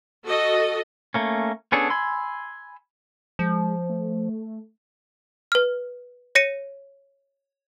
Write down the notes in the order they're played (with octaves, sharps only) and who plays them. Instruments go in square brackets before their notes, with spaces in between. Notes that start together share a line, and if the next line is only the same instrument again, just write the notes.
[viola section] F#4 A4 D#5
[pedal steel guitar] A3 A#3 C#4
B3 C#4 D4 G#4 A4
G#5 B5 C6 E6
[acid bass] F3 [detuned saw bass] G#3
[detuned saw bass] A3
[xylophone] B4 F6
C#5 A#6 C#7 D#7